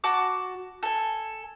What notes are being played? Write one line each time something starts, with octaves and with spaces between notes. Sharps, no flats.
F#4 A5 D6
A4 G#5